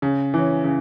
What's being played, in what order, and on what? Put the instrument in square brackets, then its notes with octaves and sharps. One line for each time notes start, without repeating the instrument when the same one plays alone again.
[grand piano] C#3
E3 C#4
C#3